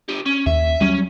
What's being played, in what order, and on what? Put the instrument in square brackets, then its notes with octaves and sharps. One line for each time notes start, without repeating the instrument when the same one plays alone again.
[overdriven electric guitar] D3 G4
C#4
[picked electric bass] D#2 [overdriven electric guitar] E5
[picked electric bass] F#3 G3 [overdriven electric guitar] C#4